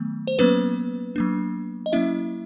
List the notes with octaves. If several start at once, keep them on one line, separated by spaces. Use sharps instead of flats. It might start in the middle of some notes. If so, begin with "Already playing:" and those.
Already playing: D#3 F#3 A3 B3
C5
F#3 A#3 B3 C#4 B4
F#3 A#3 D4
D#5
F#3 A#3 C#4 E4 E5